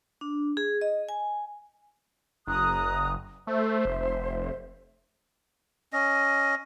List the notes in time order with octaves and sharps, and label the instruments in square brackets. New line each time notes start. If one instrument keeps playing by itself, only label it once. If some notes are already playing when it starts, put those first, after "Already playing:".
[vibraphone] D4
G#4
D#5
G#5
[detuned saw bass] F#1 [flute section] A#5 D#6 F#6
[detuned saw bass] A3 [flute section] C5 E5
[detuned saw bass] F1
[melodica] C#4 D#5